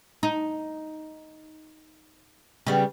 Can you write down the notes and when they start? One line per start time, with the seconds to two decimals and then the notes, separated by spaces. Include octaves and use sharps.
0.23 D#4
2.66 C#3 G3 B3